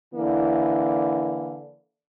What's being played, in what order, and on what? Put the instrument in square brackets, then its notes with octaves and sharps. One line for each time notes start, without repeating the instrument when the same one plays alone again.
[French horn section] D3 E3 A#3 E4